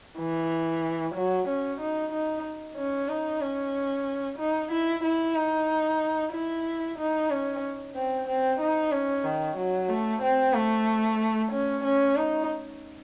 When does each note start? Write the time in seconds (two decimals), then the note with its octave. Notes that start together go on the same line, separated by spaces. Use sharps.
0.18 E3
1.15 F#3
1.48 C#4
1.80 D#4
2.12 D#4
2.77 C#4
3.09 D#4
3.41 C#4
4.38 D#4
4.71 E4
5.04 E4
5.36 D#4
6.33 E4
6.98 D#4
7.30 C#4
7.95 C4
8.28 C4
8.60 D#4
8.92 C#4
9.24 D#3
9.57 F#3
9.89 A3
10.22 C4
10.54 A3
11.52 C#4
11.84 C#4
12.16 D#4